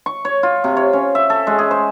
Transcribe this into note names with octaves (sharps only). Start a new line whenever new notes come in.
C#6
C#5
F4
C3
C#5
C#4
E5
A4
G#3
G#4
C5